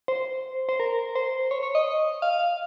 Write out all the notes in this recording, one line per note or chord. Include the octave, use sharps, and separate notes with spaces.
C5
C5
A#4
C5
C#5
C#5
D#5
F5